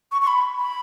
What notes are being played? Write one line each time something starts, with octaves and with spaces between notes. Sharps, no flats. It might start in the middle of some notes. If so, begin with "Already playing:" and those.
C#6
C#6
B5
B5